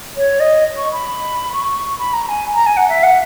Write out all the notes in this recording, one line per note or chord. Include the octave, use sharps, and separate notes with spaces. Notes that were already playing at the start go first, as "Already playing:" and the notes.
C#5
D#5
C#6
B5
C#6
B5
A#5
G#5
A#5
G#5
F#5
E5
F#5